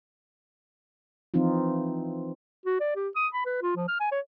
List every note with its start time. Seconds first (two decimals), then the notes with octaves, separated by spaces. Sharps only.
1.34 E3 F3 C4 D#4 F4
2.66 F#4
2.80 D5
2.95 G4
3.16 D#6
3.33 B5
3.46 B4
3.62 F4
3.76 F3
3.88 F6
4.00 G#5
4.11 C#5